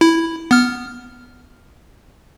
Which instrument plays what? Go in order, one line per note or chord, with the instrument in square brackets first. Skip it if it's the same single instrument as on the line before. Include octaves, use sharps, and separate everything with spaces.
[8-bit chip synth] E4
B3 F6